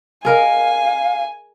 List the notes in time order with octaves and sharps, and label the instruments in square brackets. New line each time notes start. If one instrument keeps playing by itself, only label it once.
[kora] G#4 A#4 D#5 [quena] F5 [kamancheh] G#5